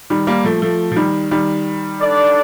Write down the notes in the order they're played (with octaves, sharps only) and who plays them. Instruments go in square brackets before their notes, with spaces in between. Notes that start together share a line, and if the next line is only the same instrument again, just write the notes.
[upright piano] D#3 G3
G3 A#3
F3 A3
F3 A3
F3
D#3 G3
D#3 G3
[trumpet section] D4 A4 D5